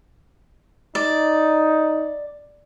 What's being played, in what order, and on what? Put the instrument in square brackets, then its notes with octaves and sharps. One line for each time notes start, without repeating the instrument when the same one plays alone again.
[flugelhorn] D#4 [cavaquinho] D5